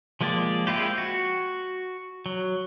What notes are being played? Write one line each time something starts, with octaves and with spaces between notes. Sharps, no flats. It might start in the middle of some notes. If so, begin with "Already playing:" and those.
F3 G#3 A#3 G4 D5
G#3 C4 E4 F4 G4
F#4
F#3